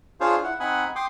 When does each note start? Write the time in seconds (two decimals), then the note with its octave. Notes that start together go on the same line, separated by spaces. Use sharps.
0.20 D4 F4 G#4 C5 C#5 F5
0.44 E4 F#5
0.60 C4 D#4 F#5 G#5 B5 D#6
0.95 G5 C6 D6 D#6